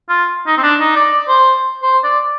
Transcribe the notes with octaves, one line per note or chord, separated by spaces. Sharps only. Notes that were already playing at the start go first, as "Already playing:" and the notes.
F4
D#4
C4
D4
D#4
D5
C5
C5
D5